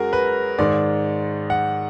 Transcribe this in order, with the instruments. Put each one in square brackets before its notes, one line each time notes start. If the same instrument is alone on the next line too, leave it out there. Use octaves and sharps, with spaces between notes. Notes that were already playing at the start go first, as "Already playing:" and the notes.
Already playing: [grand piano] F#2 G#3 F#4 G#4 A#4
B4
G#2 D#3 G#3 D5
F#5